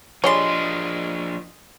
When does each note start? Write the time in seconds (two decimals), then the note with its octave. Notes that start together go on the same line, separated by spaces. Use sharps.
0.24 F3 G3 D4 G#4 C#5 D#5 C6